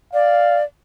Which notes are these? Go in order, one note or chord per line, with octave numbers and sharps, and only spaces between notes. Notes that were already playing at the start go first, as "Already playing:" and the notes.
D5 F5